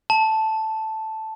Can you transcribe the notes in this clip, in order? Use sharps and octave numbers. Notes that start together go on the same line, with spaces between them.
A5